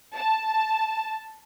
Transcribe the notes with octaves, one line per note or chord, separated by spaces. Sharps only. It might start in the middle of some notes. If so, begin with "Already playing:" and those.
A5